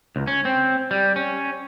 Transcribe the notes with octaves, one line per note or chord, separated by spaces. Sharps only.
C#2
C#4
C4
G3
C#4